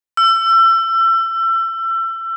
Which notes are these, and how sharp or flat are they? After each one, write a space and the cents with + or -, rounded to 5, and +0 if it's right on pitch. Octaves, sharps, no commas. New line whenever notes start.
E6 +30